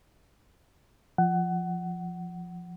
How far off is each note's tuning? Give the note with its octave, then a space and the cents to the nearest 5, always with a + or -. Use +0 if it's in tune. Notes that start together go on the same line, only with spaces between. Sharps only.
F3 +0 F#5 +20